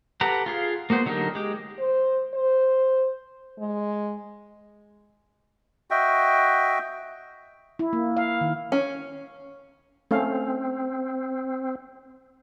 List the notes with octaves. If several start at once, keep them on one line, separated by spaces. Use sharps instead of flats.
G4 A4 B4 F#5 A#5
F4 G#4 F5
A#3 B3 F#4 C5
D3 F#3 D#4 G4 A#4
G#3 G4
C5
C5
G#3
F#4 D#5 E5 G5
E4
A#3
F5
D#3
C#4
A3 C4 C#4 F5